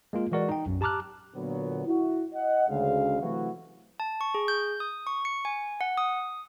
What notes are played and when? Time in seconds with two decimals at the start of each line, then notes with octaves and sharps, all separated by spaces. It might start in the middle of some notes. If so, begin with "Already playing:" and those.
0.13 G#3 A#3 F4
0.32 E3 G#3 F#4 A#4 D5
0.49 D#4 G5
0.66 B1 F#2
0.81 G4 A5 A#5 D6 F6 F#6
1.35 A#2 D3 F#3 B3
1.86 E4 F#4
2.34 D#5 F#5
2.69 D2 C#3 G#3 F5
3.21 C3 E3 F#3 A3 E4 F#4
4.00 A5
4.21 C#6
4.35 G#4
4.48 G6
4.80 D#6
5.07 C#6
5.25 C#7
5.45 G#5
5.81 F#5
5.98 D#6